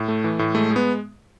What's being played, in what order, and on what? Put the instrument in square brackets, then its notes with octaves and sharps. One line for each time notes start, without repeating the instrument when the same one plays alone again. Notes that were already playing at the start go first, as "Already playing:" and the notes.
Already playing: [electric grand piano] A2
A3
E3
A2
G#3 A3
G#3
B3